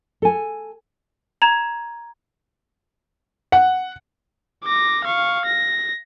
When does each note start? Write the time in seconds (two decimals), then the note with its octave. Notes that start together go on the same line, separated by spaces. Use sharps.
0.22 A4 G#5
1.42 A#5 G#6 E7
3.52 F#5
4.64 D6 A#6
5.04 F5 C#6
5.45 A#6